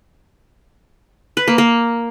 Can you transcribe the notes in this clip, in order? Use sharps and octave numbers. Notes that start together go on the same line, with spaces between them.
B4
A#3
A#3